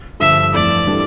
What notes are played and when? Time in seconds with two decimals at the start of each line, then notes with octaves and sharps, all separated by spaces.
0.20 G2 D3 F3 E5
0.54 F2 E3 A3 D5
0.87 E3 G3 D4 A4